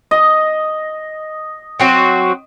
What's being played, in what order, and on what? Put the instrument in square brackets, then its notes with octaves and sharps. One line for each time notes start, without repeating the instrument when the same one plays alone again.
[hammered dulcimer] D#5
[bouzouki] F#3 C4 F#4